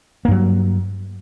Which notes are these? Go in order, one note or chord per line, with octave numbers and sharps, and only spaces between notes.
G2 F#3 A#3